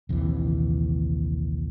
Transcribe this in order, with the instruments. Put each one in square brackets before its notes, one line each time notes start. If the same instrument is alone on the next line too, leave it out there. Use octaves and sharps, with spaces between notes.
[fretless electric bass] A#1 D#2 C3 E3